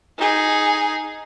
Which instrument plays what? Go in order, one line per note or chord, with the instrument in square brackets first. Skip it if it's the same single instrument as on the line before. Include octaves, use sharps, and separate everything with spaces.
[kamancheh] D#4 G#4